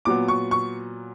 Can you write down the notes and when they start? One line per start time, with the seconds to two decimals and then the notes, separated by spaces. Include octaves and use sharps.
0.05 A#2 F#3 B3 D6
0.28 C#6
0.51 C#6